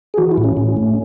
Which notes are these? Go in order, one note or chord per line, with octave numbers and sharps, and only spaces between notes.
G#4
E3 F#4
E4
A2
C#4
A2
A3